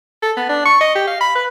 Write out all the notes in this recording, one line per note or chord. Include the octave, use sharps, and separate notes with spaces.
A4
B3
D4
C#6
D#5
G4
F5
B5
B4